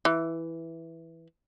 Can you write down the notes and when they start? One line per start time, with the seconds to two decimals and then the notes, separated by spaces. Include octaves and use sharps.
0.05 E3